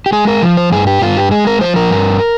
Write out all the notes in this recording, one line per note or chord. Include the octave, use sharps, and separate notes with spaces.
G4
G#3 G#4
A#4
F3
C5
G2 G#4
G4
G2 F4
G4
G#3 G#4
A#4
F3 C5
A#4
G2